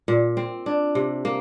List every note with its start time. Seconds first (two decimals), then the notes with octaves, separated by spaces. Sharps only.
0.08 A#2
0.37 C4
0.66 D4
0.95 C3
1.25 A#3